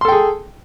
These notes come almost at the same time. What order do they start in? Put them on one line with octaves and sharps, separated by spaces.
C6 A4 G5 G#4